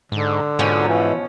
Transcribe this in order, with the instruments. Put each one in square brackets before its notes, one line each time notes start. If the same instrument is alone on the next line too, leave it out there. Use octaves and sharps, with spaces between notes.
[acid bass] G#2 [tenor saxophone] D3
[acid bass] G#2 [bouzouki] B2 F3 C#4
[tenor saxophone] E3